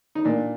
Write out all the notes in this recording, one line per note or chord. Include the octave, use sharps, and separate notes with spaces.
D#4
A#2 D4